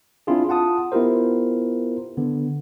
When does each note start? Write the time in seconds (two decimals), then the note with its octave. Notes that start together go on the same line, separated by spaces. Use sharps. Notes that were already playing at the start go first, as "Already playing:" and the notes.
0.27 C4 D4 E4 F4 G#4
0.49 F4 F#5 A5 D#6
0.92 B3 E4 F4 G4 A#4 C5
2.17 D3 B3